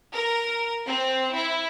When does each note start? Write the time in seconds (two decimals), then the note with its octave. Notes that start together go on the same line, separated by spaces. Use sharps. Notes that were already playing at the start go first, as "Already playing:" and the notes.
0.13 A#4
0.87 C4
1.35 E4